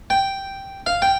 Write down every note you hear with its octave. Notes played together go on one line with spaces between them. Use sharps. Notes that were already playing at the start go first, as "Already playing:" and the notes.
G5
F5
G5